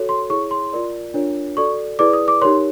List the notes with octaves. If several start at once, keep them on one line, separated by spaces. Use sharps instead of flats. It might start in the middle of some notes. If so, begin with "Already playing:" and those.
Already playing: F#4 A4 C#5
C6
E4 G#4 C#5 C#6
C6
F4 A#4 D5
D4 F4 A#4 C#5
F#4 A4 D5 C#6
E4 G#4 B4 D5 D6
D#6
D6
D#4 G4 A#4 C#5 C6